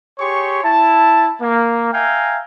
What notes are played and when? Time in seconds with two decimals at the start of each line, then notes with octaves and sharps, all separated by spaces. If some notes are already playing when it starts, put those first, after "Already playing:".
0.18 G4 G#4 C#5 C6 C#6
0.64 E4 A5
1.42 A#3
1.93 E5 F5 G5 G#5 A#5